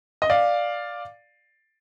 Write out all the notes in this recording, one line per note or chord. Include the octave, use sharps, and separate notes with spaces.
D#5
D5 F5